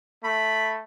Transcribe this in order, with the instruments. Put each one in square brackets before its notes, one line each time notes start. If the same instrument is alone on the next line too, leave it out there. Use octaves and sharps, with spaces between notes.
[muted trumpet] A3 [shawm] B5